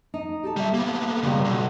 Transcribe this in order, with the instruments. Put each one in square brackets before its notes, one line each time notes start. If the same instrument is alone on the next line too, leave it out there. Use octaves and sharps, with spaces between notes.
[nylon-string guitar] D#4
G4 A4 A5
[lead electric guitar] G3 E5
A#3 B3
[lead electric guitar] C#2 [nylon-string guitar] B2 G3
[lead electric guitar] B1